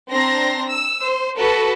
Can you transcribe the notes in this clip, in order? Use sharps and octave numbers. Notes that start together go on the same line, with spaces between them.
C4 D4 A#5 C6 A#6
E6
C5
F#4 A4 B4 A5